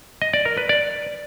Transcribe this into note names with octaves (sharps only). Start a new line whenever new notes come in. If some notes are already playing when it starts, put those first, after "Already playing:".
D#5
D5
A#4
B4
D5